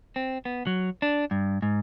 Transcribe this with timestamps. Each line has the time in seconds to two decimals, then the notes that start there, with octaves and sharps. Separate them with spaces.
0.16 C4
0.45 B3
0.67 F#3
1.02 D4
1.31 G2
1.62 G#2